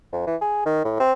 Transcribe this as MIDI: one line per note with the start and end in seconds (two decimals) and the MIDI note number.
0.12 0.22 41
0.27 0.36 52
0.41 0.64 68
0.66 0.83 51
0.84 0.96 45
1.00 1.13 60